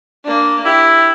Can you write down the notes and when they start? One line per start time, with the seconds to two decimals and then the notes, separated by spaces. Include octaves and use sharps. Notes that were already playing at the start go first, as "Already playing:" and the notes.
0.25 A#3 D4
0.65 E4 G4